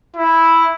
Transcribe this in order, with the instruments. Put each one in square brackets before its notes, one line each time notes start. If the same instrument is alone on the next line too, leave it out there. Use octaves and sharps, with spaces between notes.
[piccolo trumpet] E4